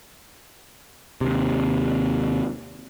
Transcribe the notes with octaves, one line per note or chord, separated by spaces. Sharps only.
D#2 C3